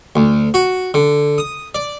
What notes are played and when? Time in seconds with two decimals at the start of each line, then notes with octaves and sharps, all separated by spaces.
0.16 D2
0.54 F#4
0.94 D3
1.38 D#6
1.75 D5